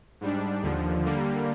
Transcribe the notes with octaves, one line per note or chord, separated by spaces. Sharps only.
G#2 G3 D4
D#2 D3 F3
D3 G3 A#3